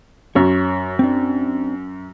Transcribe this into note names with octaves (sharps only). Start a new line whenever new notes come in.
F#2 C#5
C4 D4